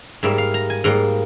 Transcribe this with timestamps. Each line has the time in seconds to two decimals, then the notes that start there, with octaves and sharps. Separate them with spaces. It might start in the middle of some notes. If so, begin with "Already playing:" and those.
0.23 G#2 G3 A#3 E5
0.38 F5
0.54 A#5
0.70 G#5
0.84 G#2 G3 A#3 A#5